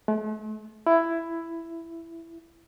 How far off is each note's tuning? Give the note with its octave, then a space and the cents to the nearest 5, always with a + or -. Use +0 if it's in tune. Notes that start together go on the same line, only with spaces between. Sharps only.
A3 -45
E4 +10